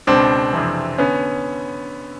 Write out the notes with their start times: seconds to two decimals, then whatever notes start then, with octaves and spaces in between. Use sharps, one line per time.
0.07 C#2 B2 C4 D4
0.53 F2 C3 E3
0.98 D3 B3 C#4